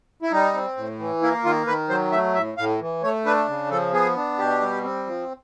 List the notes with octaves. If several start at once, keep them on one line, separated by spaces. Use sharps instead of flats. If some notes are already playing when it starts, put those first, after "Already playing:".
E4
G3 D#4
C4
A2
E3
A#3 E4
D#3 F4
D#3 B4
F#3 C5
A3 E5
A2 E5
A2 F5
E3
A3 C#5
D4 B4
C#3
F3 A4
B3 G#4
D4
B2 G4
G3
C4
F3